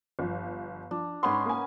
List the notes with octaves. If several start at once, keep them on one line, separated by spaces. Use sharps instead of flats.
G1 F3
F3 D4
G#2 B3 C#4 B4 C6
A#3 G#5